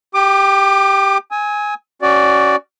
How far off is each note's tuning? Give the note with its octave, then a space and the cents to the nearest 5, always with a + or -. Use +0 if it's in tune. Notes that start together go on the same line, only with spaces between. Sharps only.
G4 +0 D6 +35
G#5 +0 E6 -45
C#4 -5 F#4 +20 D5 +0